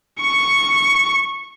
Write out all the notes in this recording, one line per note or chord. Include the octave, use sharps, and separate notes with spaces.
C#6 C#7